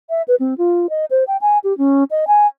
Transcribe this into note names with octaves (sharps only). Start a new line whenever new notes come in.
E5
B4
C4
F4
D#5
C5
G5
G#5
G4
C#4
D#5
G#5